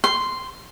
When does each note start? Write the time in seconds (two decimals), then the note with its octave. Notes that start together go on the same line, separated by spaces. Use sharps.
0.04 C6